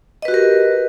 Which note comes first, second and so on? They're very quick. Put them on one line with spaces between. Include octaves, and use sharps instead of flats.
D#5 B4 F#4 G4 A#4